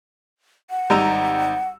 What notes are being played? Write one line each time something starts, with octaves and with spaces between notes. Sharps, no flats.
F#5
G#1 G3 D#4 A#5 E6 D#7